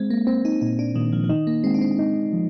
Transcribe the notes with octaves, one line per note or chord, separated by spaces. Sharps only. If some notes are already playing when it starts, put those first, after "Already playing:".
Already playing: G#3 C4
A#3
A#3 C4
D#4
A#2 D#4
D4
A#2 D#3
F3
F3
D#3 D#4
A#3
G#3 C4
D4
C4
D#4
F3